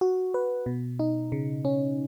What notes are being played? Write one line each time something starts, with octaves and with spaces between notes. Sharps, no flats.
F#4
B4
B2
D#4
C#3
C#4